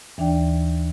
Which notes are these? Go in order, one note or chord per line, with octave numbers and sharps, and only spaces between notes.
D#2 E3 D4 D5 G5